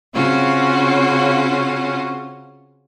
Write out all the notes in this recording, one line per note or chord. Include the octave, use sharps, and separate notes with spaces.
C#3 C4 C#4 F4 F#4